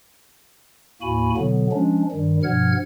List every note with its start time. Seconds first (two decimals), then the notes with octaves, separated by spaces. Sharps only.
1.02 D#2 A2 A#3 F#4 G#5 B5
1.37 B2 D3 F#3 B3
1.72 F3 G#3 C#4 D4
2.11 G2 D#3 G3
2.43 G2 B2 F3 F#5 F6 G#6